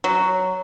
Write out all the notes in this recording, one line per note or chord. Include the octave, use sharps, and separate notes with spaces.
F#3